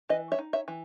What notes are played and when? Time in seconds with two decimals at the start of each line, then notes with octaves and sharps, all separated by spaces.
0.09 E3 B4 D#5
0.32 C#5 E5
0.39 D#4
0.53 C#5 E5
0.68 E3